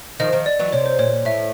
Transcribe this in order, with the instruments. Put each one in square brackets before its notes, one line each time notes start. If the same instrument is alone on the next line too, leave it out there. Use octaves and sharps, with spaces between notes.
[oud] D#3 F3 [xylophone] D#5
[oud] D#3 F3
[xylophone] D5
[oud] E3 F#3
[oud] C3 [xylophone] C#5
[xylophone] C5
[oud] A#2 [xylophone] C#5
[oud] A2 [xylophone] E5